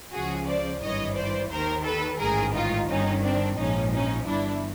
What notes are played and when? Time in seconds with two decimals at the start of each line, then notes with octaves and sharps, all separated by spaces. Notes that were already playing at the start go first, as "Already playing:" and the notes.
0.12 C#2 C#3 F3 F#4 G#4
0.47 C5 D5
0.82 G#1 G2 E3 C#5 D#5
1.16 C5 D5
1.50 D#2 D#3 A#4 C5
1.85 A4 B4
2.20 A1 G#2 D#3 G#4 A#4
2.54 D#4 F4
2.88 G1 G2 D#3 C#4 D#4
3.23 C4 D4
3.57 A#1 G#2 F3 C#4 D#4
3.93 C#4 D#4
4.27 G1 G2 E3 D4 E4